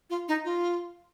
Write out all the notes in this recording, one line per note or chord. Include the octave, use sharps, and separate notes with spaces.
F4
D#4
F4